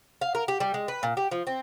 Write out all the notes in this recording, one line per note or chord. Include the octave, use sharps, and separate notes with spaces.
F5
A#4
G4
G3
G#3
B4
A#2
G4
F3
C4